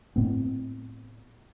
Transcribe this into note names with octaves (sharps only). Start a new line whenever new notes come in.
A2 B3 C4